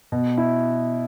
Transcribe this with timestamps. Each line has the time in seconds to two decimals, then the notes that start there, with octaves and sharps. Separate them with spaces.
0.12 B2
0.38 E4